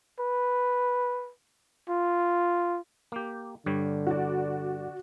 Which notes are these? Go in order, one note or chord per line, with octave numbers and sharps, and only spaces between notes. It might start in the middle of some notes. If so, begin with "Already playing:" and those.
B4
F4
A#3 G4
G2 D3 G3 C#5
F#4 D5